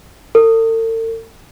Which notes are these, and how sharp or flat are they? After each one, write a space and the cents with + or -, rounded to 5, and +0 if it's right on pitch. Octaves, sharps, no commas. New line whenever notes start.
A4 +45